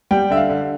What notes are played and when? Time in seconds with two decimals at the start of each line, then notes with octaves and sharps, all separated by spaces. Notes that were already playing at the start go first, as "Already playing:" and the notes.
0.11 G3 G5
0.30 D3 E5
0.37 F5
0.50 D3